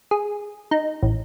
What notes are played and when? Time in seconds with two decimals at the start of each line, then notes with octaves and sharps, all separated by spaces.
0.11 G#4
0.71 D#4
1.02 A1